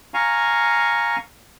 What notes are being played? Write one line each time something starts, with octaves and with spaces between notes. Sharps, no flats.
F5 G#5 A#5 C#6